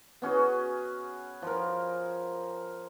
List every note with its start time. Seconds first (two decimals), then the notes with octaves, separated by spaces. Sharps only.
0.22 B3 C#4 F#4 G#4
1.42 F3 A#4